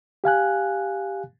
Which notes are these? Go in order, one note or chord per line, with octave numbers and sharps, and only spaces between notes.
G4 F5 G#5 F#6